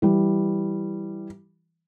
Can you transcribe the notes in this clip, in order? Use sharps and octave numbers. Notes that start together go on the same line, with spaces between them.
E3 G3